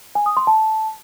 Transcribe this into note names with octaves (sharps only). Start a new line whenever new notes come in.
G#5
D#6
C6
A5